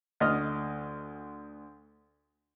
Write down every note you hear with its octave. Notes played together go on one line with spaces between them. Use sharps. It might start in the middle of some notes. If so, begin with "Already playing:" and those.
D2 D#5 F6